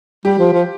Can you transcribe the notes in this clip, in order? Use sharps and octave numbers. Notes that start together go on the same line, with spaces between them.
G3 G4
F3
F3